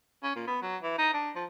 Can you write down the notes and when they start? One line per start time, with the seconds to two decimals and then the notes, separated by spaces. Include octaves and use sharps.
0.23 C#4
0.36 A#2
0.47 B3
0.62 F#3
0.83 E3
0.98 D#4
1.14 D4
1.36 F3